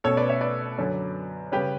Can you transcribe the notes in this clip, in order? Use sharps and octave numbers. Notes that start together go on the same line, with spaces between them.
B2 A3 C#4 A4 C#5
B4 D5
C#5 E5
B4 D5
F#2 D3 F#3 C#4
C#3 G3 C#4 G4 B4